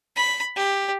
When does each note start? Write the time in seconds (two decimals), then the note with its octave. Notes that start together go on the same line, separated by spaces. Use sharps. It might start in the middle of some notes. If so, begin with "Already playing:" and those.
0.16 B5
0.56 G4